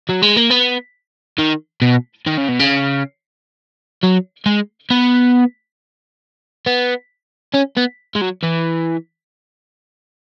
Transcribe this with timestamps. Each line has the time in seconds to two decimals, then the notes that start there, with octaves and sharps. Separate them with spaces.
0.10 F#3
0.23 G#3
0.37 A#3
0.51 B3
1.38 D#3
1.82 B2
2.27 D#3
2.38 C#3
2.49 B2
2.60 C#3
4.03 F#3
4.46 G#3
4.90 B3
6.67 B3
7.54 C#4
7.77 B3
8.15 G#3
8.21 F#3
8.43 E3